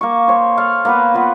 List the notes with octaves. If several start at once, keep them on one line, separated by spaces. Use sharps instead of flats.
A#3 C#6
C5 C#5
A4 F5
A#3 B3 B4
B3 F4 B4